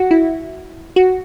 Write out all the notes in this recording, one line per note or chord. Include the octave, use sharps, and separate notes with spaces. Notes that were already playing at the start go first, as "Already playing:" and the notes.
Already playing: F#4
E4
F#4